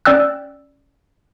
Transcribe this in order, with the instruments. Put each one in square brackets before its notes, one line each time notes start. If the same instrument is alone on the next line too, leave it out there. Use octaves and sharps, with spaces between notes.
[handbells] C#4 D5 G5 E6 F#6